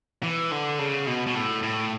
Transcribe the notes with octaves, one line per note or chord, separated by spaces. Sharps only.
E3
D3
C#3
B2
B2
A2
A2